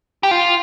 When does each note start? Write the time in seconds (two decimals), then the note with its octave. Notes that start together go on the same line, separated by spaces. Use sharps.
0.23 G4
0.31 F4